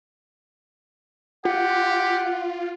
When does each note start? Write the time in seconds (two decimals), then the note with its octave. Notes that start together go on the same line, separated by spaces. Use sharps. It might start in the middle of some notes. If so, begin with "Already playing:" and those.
1.45 F4 G4 F#5